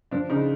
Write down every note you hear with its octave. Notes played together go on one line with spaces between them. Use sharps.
F3 D4
C#3 D#4